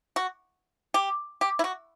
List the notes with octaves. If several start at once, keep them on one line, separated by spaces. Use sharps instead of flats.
F#4
G4
G4
E4
F#4